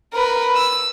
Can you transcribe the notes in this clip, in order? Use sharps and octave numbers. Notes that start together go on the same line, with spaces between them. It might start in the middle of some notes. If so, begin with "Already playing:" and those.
A#4 B4
E6